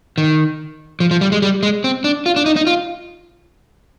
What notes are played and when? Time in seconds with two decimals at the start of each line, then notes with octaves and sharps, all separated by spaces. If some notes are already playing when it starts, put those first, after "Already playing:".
0.18 D#3
1.00 F3
1.11 F3
1.21 G3
1.32 G#3
1.42 G3
1.63 G#3
1.84 C4
2.04 D4
2.26 F4
2.36 D4
2.46 D#4
2.56 D#4
2.67 F4